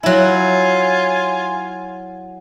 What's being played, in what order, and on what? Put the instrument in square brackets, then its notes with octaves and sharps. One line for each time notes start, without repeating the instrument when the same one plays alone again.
[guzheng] F#3 E4 [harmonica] F4 G#5